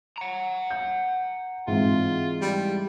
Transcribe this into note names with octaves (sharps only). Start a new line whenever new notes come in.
F#5 A#5
G6
G#2 E3 C4 F4
G3